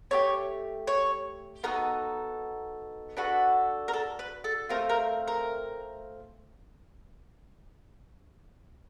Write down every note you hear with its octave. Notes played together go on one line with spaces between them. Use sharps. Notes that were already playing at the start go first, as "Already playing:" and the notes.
A3 D4 G4 C#5
C#5
B3 D#4 F#4 A4 A#4
D4 F#4 A4 B4
A#4
A4
B4
A4
A3 C4 F4 A#4
A#4
A#4